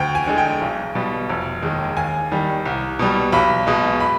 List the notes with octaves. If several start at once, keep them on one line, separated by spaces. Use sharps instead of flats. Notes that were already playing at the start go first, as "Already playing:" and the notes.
Already playing: D2 G5
G#5
D3 G#3
G5
B1
B2 G3
F1
D#2 D#3 G#3
D#2 G#5
D#3 G3
C2
B2 G3
B1 B5
B2 G#3
B5